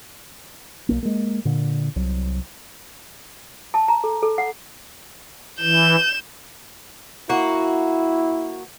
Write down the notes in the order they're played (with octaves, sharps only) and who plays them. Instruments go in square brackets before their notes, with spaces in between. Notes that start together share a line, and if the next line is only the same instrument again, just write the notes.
[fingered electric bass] B1 A#3
G#3 A#3
A#2 D3
C2 F#3
[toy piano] A5
A#5
A4
A4
F#5
[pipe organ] E3 [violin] G6 E7
[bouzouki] A#3 F#4 [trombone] E4